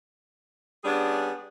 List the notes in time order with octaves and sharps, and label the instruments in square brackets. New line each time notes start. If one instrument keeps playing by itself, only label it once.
[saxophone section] G3 B3 C#4 D4 G#4